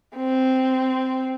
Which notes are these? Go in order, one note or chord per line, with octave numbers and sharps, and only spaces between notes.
C4